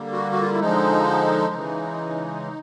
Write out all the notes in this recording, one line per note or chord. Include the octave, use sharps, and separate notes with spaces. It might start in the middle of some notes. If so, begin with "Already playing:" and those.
Already playing: D3 G3 A#3
F#4
F#4
F4
E4
D3 F3 G#3 D#4
C#3 E3 G#3